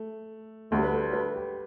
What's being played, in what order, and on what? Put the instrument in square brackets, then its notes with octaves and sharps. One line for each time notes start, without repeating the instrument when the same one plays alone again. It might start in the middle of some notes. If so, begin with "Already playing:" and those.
Already playing: [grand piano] A3
[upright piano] D2 D3 G3 [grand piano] A3
[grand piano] B4
A4
B4
G4